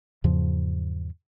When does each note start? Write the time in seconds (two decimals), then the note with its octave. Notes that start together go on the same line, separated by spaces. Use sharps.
0.24 E2 G#2 C#3 F3